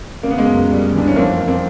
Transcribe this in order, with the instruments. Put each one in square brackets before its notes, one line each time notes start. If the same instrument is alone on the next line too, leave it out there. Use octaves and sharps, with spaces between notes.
[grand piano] C#3 A#3
B3
G#3 A#3
F#2
G3
E3 D4
C#4
F2 A#3 C4
F2
A#3 C4